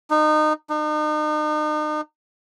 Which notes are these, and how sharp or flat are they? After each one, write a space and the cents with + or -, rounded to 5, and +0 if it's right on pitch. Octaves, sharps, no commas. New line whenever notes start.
D#4 -25
D#4 -40